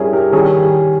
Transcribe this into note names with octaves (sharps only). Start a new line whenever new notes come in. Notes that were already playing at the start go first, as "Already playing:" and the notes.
Already playing: G3 C#4 E4 G4 G#4 A#4
G4 A#4
D#3 G3 C#4 G#4
G4